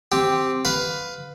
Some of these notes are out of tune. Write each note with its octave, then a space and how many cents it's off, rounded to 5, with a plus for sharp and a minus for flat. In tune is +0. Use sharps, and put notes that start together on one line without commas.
C4 +0 G4 +0
B4 +10 F5 +10